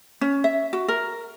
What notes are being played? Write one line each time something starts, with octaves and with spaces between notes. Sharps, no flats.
C#4
E5
F#4
A#4